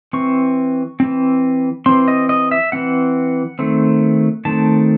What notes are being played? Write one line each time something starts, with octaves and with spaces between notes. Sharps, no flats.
E3 C4 C#6
E3 C4
E3 C4 C6
D#5
D#5
E5
E3 C4 F#5
D#3 A3 C4
D#3 A3 C4 A5